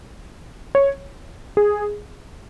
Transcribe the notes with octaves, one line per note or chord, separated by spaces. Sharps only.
C#5
G#4